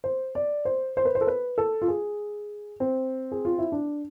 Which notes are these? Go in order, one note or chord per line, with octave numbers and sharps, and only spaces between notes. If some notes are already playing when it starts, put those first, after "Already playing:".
C5
D5
C5
C5
B4
C5
A4
B4
A4
F4
G#4
C4
G#4
F4
E4
D4